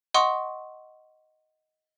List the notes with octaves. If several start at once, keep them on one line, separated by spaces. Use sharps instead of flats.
D#5 F#5 C6 C#6 D#6